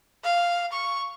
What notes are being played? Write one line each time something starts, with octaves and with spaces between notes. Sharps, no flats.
F5
C#6